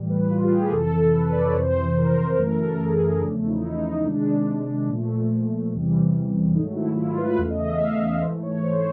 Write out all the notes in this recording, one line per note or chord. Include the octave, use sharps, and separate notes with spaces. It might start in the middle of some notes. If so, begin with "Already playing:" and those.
Already playing: A2 E3 G3
B4
F4
G4
G#4
A#4
F2 C3 E3 A4
B4
D5
C#5
F2 C3 E3 C5
A#4
F#2 C#3 E3 A3 A#4
A4
A#4
G#4
E2 C#3 F3 A3 D4
D#4
E4
D#4
C3 D#3 G#3 D4
A#2 F3 A3
E2 C3 E3 G3
G#2 D#3 F#3 A3 D#4
E4
E4
F4
B4
E2 C#3 E3 A3 F5
D#5
E5
F5
E5
G#2 E3 A3 C5
C#5
C5